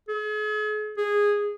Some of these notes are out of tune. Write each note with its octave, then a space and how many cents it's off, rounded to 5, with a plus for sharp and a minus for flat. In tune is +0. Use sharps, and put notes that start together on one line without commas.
G#4 +45
G#4 -10